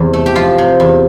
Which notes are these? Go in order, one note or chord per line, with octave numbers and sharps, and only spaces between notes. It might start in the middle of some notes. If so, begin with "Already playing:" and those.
Already playing: E2 C3 G4
A3
G4
F3 F4
C3
E2